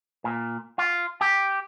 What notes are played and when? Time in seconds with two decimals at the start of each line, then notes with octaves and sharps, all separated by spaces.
0.24 A#2
0.78 F4
1.21 G4